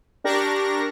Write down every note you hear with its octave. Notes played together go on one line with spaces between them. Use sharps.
D4 G4 A#4 C#6 A#6